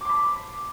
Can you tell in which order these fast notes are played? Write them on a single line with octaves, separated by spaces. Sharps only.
D6 C6 B5